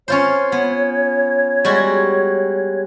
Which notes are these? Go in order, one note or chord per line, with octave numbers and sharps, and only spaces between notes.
C#4 F4 C5 C#5
B3
G3 G#3 F#4